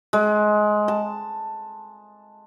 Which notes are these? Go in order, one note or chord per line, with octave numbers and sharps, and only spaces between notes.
G#3
A5